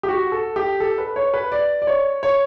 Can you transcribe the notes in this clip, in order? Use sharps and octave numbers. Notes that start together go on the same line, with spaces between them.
G4
F#4
A4
G4
A4
B4
C#5
B4
D5
D5
C#5
C#5